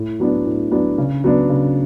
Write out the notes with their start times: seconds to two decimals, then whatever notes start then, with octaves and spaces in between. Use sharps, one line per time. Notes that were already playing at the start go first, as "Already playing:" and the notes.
Already playing: A2
0.20 F#3 B3 D4
0.46 A2
0.72 F#3 B3 D4
0.98 C#3
1.24 F#3 B3 D4
1.49 C#3